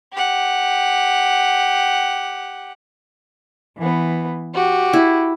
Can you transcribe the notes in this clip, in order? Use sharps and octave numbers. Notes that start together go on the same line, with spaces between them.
G4 F#5
E3 B3
F#4 G4
E4